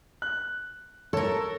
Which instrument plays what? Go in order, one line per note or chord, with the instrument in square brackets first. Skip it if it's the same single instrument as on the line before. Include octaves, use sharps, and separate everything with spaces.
[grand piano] F#6
[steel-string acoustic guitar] A4 A#4 [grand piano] C#5 A5